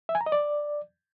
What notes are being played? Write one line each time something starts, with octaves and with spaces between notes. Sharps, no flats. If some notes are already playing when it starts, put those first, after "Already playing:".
E5
G#5
A#5
D#5
D5